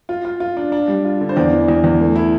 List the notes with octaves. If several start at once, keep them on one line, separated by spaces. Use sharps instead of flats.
F4
F4
F4
D4
D4
G3
F4
D3
C5
E2 D5
E3
E2
E2
A3
E4